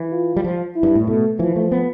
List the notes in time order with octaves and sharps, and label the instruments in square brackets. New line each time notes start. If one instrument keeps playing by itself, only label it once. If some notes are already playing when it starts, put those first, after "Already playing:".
Already playing: [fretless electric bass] E3
[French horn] F4
[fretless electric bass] G3
F3
[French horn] E4
[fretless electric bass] G2
A2
[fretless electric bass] B2 [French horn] A3
[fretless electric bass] E3 [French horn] F3
[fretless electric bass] A3
B3